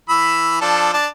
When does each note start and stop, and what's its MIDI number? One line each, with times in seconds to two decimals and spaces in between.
0.09 0.58 52
0.09 0.58 83
0.09 0.58 88
0.61 0.93 53
0.61 0.93 62
0.61 0.93 69
0.93 1.07 62
0.93 1.07 81